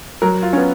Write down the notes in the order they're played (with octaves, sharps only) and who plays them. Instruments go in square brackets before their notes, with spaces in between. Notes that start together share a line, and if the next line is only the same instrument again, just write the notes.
[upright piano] F#3 [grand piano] A#4
[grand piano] F4
[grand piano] B3 [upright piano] C#4